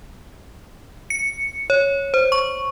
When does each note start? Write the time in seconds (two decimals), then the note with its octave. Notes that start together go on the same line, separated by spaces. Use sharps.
1.10 C#7
1.70 C#5
2.14 C5
2.32 C#6